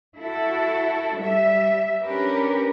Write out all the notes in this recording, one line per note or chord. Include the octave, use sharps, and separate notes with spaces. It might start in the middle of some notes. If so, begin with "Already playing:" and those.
E4 F#4 A4
G3 E5
C#4 D4 G4 A#4 B4